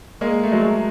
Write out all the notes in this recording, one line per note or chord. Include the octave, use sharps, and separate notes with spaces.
G#3 A#3
A3
F#3 G#3